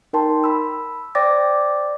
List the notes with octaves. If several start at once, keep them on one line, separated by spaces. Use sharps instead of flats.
D#4 A#4 G5 A5 C6
B5 E6
C5 D5 G5 D6 A6 A#6